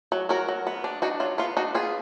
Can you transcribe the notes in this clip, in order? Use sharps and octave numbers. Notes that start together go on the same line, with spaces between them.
F#3
F#3 F#4 A#4
F#3
B3
D4
D4 D#4 F#4
F#3 F4
B3 F4
D4 D#4 F#4
B3 F4 G#4